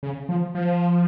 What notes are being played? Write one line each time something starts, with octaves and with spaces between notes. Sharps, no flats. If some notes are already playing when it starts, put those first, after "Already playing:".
C#3
F3
F3